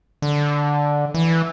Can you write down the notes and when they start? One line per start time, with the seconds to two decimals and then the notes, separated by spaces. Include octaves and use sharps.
0.22 D3
1.14 E3